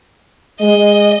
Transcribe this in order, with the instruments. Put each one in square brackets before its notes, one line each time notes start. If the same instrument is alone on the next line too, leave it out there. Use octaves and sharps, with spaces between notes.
[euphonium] G#3 [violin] D#5